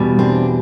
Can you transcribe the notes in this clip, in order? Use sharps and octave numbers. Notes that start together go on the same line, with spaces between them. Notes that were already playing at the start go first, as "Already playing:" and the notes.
Already playing: E2 B2 G3
C4 D4